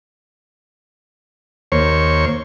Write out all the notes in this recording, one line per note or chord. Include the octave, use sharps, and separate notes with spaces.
D#2 A#3 C5 C#5 C#6